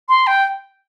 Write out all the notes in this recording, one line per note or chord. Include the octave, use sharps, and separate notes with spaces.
C6
G5